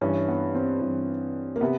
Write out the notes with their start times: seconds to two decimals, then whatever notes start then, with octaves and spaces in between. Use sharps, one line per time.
0.01 G2 E3 C#4
0.28 B3
0.55 C4
0.81 G2 E3
1.56 A#3
1.61 C3 B3